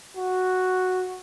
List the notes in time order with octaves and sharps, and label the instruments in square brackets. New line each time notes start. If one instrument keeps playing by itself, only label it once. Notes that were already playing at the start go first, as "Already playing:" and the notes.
[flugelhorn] F#4